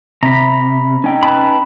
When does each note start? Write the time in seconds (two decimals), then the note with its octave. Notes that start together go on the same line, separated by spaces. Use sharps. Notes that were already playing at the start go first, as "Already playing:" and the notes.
0.23 C3 A#5 B5
1.04 C#4 D#4 G5
1.23 B4 A5 B5